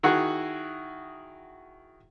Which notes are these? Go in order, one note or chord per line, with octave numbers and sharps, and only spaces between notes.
D#3 E4 F#4 G#4 F#5